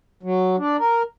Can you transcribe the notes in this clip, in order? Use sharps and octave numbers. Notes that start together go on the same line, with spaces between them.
F#3
D4
A#4